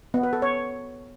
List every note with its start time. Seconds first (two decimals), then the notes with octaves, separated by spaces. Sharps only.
0.14 B3
0.23 B4
0.33 A4
0.42 C#5